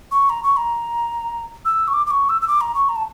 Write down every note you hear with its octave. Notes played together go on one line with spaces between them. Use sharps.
C#6
A#5
C#6
A#5
E6
C#6
D6
D6
C#6
E6
E6
D6
A#5
C#6
A#5
A5